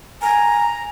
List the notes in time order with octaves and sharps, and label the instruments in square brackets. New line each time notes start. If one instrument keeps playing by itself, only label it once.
[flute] G#5 [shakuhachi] A#5